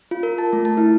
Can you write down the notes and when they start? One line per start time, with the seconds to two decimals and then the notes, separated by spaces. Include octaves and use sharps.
0.11 F4
0.23 A#4
0.38 A5
0.53 A3
0.65 A5
0.77 E4